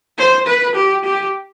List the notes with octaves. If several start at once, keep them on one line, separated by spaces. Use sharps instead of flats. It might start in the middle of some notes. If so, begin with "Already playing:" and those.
C5
B4
G4
G4